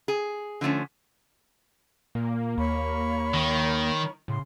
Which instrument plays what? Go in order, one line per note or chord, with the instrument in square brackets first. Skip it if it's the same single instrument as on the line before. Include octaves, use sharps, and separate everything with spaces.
[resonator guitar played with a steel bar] G#4
D3 F3 A3 C#4
[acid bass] A#2 [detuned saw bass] A#3
[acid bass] D#2 [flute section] C#5 B5 C#6
[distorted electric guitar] D#3
[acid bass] A2 [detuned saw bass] C#3 [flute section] C6